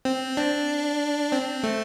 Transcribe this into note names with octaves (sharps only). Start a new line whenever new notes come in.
C4
D4
C4
A3